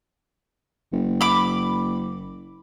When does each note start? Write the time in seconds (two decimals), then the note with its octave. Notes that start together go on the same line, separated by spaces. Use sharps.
0.93 F#1
1.21 B5 D6